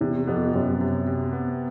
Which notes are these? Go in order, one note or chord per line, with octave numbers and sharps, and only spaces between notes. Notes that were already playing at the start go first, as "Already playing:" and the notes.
E2 C3
F2 B3
F#2 C3
C3
C3
B3